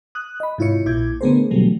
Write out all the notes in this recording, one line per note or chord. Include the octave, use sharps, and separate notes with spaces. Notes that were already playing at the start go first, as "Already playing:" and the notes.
D#6 F#6
D#5 B5
G#2 C3 E4 F4 C#5 C#7
A#1 A#2 E4 D6 G6 G#6
D3 A3 B3 G#4 A#4 C5
B2 D3 E3 F#3 G3 A3